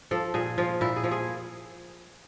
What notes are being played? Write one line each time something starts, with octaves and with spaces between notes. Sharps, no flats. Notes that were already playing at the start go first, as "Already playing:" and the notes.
F3 A4
A#2 G#4
F3 F4
A#2 E4
G#4
F3
G#4